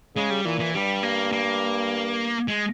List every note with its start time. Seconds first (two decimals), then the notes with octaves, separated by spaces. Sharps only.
0.15 C#3 G#3
0.30 G3
0.45 A#2 E3
0.60 E3
0.74 G2 G3
1.03 A#3
1.32 A#3
2.48 G#3